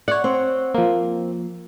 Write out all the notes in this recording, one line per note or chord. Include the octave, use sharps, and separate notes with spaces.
C#5 D5 F#5
C4
F3 A#3